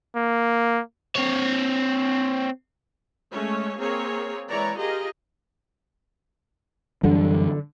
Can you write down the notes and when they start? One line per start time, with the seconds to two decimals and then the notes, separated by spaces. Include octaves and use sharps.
0.16 A#3
1.16 C4 C#5
3.31 G#3 A3 C#4 C#5
3.78 A#3 C4 G#4 C#5
4.49 E3 G#3 C#5 D5 A#5
4.79 F4 G4 G#4 A#4 D#5
7.03 F#2 D3 E3 G3